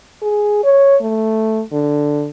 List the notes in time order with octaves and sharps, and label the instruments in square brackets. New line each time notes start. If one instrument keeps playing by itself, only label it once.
[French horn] G#4
C#5
A3
D3